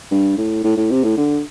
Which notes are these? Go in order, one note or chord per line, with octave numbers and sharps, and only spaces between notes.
G2
A2
A2
A2
C3
A2
D3